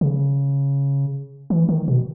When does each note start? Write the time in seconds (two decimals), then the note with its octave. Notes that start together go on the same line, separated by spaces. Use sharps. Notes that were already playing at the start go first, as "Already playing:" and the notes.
0.01 C#3
1.50 E3
1.69 D#3
1.88 B2